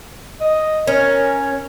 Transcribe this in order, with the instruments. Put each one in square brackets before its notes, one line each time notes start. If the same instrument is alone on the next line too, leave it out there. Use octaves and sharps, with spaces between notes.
[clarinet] D#5
[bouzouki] C#4 [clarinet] A#4